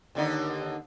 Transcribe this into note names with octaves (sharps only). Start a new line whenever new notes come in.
D#2 D3 D#4